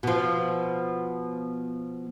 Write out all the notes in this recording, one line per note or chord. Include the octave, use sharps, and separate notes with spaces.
B2 F3